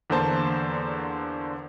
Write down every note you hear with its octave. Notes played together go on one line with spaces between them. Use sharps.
E2 D3 A#3 C5 A5